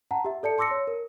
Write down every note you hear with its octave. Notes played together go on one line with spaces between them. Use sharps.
F#5 A5 A#5
G4 E5
A4 D5 A5 C#7
A5 C6 D6 E6 A#6 C#7
C#5
A#4